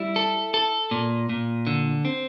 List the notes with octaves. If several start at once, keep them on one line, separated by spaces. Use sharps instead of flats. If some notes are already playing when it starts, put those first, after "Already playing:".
Already playing: G3 E4
A4
A4
A#2
A#2
D3
C4